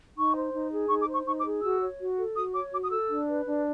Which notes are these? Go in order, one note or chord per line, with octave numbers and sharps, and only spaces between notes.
D#4 C#6
C5
D#4
G#4
D#4 C#6
D6
C5
C#6
D#4 C#6
D6
G#4
F#4 E6
C#5
F#4
A4
F#4 D#6
C#5 D6
F#4 D6
D#6
A4 E6
D4
B4
D4